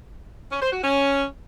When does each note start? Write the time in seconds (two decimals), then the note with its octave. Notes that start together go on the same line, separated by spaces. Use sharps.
0.51 C#4
0.62 C5
0.72 F#4
0.83 C#4